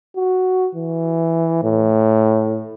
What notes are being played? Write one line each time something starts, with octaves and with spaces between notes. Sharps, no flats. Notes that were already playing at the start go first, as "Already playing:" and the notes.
F#4
E3
A2